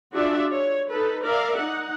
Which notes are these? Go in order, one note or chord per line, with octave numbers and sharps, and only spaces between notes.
D4 F4 F#4 G#4 D5 E5
C#5
D#4 A4 B4
A#4 D5 E5 F5
D#4 F#5